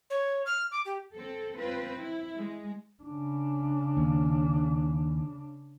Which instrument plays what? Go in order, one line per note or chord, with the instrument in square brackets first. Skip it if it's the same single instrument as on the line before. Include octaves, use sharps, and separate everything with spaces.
[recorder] C#5
F6
D6
G4
[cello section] C4 A4
C4 F4 B4
E4
G#3
[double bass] C#3 D4
[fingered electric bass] D#2